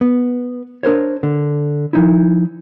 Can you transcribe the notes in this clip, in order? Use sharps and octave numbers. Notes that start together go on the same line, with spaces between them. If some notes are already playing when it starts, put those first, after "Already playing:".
B3
D4 A#4 C5 C#5
D3
F3 D#4 E4